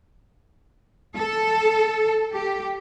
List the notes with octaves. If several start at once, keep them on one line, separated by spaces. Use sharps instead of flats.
A4
G4